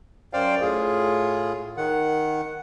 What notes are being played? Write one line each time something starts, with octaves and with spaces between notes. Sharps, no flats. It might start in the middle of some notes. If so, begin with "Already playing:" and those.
F#2 C5 D5 F5 G5
A2 F4 G#4
D#3 F#5